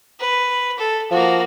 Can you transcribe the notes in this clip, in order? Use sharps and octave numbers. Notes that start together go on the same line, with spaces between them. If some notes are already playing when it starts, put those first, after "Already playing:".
B4
A4
F3 A#3 F#4